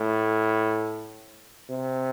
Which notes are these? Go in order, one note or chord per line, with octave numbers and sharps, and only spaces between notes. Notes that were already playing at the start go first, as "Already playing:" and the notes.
Already playing: A2
C3